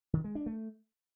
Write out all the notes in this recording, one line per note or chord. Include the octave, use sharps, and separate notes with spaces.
D#3
G#3
D4
A3